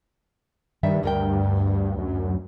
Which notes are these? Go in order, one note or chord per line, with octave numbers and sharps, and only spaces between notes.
G2 D#3 G3 E5
D2 A#4 G5
F#2